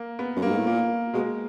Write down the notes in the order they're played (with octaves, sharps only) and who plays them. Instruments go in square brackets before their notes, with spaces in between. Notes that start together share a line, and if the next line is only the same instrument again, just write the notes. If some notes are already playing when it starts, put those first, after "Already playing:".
Already playing: [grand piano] A#3
B3
[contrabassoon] F#2
[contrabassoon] G2 [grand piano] A#3
[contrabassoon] G#2
A2
[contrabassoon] A#2 [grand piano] A#3
[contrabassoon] B2 [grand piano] G#3